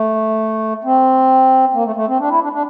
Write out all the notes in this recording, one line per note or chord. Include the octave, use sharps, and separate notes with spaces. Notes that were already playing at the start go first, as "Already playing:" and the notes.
Already playing: A3
C4
A#3
A3
A3
C4
D4
E4
D4
D4